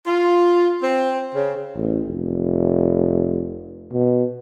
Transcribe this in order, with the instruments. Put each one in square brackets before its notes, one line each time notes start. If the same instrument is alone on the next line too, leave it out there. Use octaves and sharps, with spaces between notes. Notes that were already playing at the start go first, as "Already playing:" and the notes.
[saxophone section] F4
C4
C#3
[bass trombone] A1
F1
B2